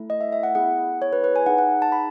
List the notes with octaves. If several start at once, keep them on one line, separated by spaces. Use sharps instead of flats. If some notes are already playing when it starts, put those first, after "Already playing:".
Already playing: A3 E4 A4
D#5
E5
E5
F#5
B3 E4 G#4 F#5
C#5
B4
B4
G#5
D#4 G#4 F#5
F#5
A5
B5